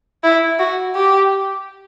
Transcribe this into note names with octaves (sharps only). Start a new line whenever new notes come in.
E4
F#4
G4